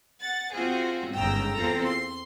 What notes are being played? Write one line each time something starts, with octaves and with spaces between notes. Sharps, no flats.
F#5 A6
C4 F4 F#4 G#4
G1 G#2 C#3 G5 A#5 E6
E2 C4 F4 A4 A#5
C6